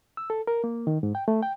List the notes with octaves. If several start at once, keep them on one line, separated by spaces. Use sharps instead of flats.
E6
A4
A#4
A#3
D#3
G#2
G5
A3
G5